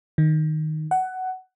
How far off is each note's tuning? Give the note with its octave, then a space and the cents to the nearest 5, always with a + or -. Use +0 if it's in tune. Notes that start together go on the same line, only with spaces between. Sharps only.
D#3 -5
F#5 +15